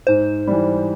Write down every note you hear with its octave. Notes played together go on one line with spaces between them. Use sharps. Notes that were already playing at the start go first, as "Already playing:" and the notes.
G#2 C5
E3 G3